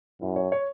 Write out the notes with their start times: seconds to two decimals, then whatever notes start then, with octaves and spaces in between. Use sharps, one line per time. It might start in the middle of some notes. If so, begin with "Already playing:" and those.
0.21 F#2 E4
0.36 C#5
0.52 C#5